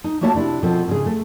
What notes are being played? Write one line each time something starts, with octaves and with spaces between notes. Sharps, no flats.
D#4
A3 A#3 F#4 C#5 E5 A5
C3 D4 E4
B2 F3 C4 A4
G#2 C#3 G#4
A3